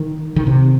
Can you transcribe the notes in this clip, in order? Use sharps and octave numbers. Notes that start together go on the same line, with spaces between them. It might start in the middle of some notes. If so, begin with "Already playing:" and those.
Already playing: D#3
D#3
C3